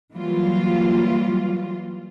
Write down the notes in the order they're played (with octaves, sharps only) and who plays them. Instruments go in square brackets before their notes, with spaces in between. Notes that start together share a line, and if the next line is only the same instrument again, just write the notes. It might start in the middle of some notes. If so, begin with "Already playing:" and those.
[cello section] E3 F#3 G3 A#3 F4